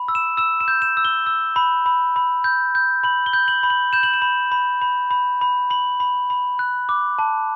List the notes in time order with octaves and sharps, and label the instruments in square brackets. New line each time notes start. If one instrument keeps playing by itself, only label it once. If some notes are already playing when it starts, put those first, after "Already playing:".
Already playing: [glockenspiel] B5
E6
E7
E6 E7
E7
G6
E7
E6
G7
E6
B5
B5
B5
G6
G6
B5 F#7
G7
G6
F#7
B5
F#7
G6 E7
F#7
E7
B5
B5
B5
B5
B5
B5 F#7
B5
B5
F#6
D6
A5